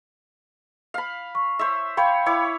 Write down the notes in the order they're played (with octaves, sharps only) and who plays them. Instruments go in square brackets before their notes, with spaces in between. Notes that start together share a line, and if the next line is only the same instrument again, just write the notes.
[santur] F5 B5
[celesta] C#6
[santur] C5 C#5 E5
[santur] C5 C#5 [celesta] F5 G5 B5
[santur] E4 C#5 D6